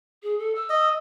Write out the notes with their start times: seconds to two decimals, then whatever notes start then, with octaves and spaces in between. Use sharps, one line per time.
0.23 G#4
0.39 A4
0.55 E6
0.70 D#5